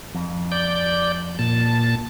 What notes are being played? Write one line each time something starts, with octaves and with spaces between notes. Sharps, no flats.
F2
D5 G6
A#2 A5